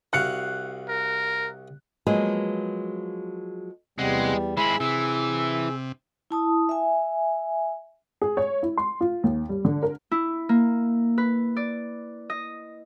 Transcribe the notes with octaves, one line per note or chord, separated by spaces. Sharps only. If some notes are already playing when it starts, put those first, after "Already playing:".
C2 F#4 F5 F#6 C#7
A#4
F3 F#3 G#3 A#3 B3 G#4
E2 C3 G3 G#3 F#5
G#3 C4 E4 G#4 B5
C3 E3 E6
E4 A5 D#6
E5 G#5
G#4
C#5
E4
C6
F4
D#2
G3
D3
A#4
E4
A#3
B4
D5
D#5